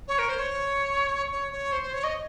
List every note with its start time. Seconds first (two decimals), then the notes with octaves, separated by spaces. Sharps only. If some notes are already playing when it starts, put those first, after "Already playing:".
0.08 C#5
0.18 A#4
0.29 C5
0.39 C#5
1.32 C#5
1.52 C#5
1.72 C5
1.83 C5
1.93 C#5
2.04 D#5